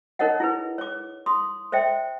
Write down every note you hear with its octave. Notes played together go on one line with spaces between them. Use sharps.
D#4 A#4 C#5 D#5 F#5
E4 G#4 B4
C#5 D6
C6 D#6
C5 D5 E5 G5